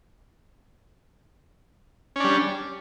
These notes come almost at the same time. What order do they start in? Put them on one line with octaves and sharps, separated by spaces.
C#4 D4 G3